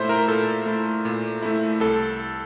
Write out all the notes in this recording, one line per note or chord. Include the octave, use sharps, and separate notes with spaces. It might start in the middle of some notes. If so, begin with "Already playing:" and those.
Already playing: A#2 A3 E4 C5 E5
A#4
A#2 A4
A3 E4
A#2
A3 E4
C2 A4